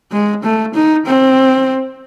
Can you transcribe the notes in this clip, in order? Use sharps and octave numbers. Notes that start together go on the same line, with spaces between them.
G#3
A3
D#4
C4